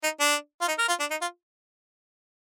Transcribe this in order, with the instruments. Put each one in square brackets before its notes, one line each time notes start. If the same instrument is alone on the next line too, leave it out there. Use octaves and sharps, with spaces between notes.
[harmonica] D#4
D4
F4
D#4
A#4
F4
D4
D#4
F4